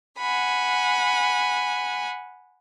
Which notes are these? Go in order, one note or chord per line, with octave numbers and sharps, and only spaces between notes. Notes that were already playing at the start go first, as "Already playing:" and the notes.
F#5 G#5 B5